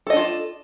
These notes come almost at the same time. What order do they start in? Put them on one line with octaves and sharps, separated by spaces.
A4 D#5 D4 F4